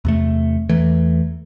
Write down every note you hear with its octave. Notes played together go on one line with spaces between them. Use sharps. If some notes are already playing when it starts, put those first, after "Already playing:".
E2 C3 A3
E2 E3 A3